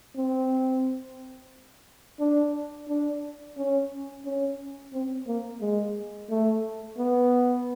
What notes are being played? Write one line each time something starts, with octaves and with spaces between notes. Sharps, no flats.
C4
D4
D4
C#4
C#4
C4
A#3
G#3
A3
B3